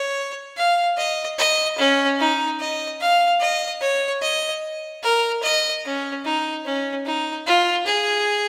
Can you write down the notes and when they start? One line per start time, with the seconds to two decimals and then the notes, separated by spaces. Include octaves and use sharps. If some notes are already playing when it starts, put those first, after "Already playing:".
Already playing: C#5
0.57 F5
0.98 D#5
1.39 D#5
1.78 C#4
2.20 D#4
2.60 D#5
3.01 F5
3.41 D#5
3.81 C#5
4.22 D#5
5.03 A#4
5.43 D#5
5.84 C#4
6.25 D#4
6.65 C#4
7.05 D#4
7.47 F4
7.86 G#4